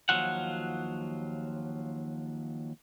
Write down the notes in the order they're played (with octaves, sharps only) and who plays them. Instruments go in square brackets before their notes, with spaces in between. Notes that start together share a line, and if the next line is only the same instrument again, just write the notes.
[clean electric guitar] D#2 F3 F#3 F4 F#5